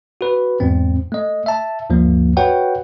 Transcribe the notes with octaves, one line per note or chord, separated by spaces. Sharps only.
F#4 B4
E2 G#2 C4
A3 D#5
E5 A5
D2 G2 F3 A#3
F#4 B4 C#5 F#5 G5